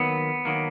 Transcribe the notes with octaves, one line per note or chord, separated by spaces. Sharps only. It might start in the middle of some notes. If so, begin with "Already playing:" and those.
Already playing: D#3 F#3 A#3 B3
D#3 F#3 A#3